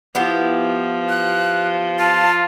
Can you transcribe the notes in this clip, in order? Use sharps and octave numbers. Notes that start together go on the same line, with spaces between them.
F3 B3 E4 G4
F#6
F4 A5